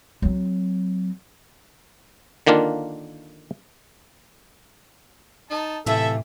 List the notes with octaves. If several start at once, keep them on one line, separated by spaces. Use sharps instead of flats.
F#3 C4
D3 D#3 A#3 D4 F4
D#4 A5
A2 C3 E3 F4 A4 E5